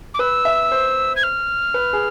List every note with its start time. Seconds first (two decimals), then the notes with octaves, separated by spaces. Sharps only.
0.14 D6
0.19 B4 E6
0.45 E5
0.72 C5
1.16 G#6
1.23 F6
1.74 B4
1.93 G#4